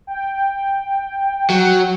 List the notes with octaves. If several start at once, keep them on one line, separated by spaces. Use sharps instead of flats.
G5
F#3